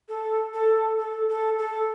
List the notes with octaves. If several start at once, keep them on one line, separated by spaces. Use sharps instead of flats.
A4
A4
A4
A4
A4